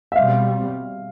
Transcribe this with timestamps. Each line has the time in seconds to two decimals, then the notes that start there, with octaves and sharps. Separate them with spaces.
0.12 E5
0.16 B2 G3 C4 F5